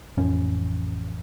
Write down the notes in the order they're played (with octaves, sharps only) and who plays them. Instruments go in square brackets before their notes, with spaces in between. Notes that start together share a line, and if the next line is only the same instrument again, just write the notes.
[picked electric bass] A1 F2 C#4